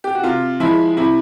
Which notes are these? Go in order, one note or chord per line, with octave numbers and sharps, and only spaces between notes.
G4
F#4
C3 F4
F3 G#3 E4
C3 E4